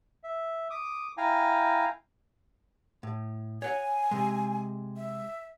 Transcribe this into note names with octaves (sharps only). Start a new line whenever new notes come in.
E5
D6 D#6
E4 F5 G5 G#5 A#5
A2
C#5 F#5 G#5
C3 G#3
E5